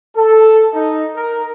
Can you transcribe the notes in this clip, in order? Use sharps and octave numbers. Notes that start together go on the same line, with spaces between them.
A4
D#4
A#4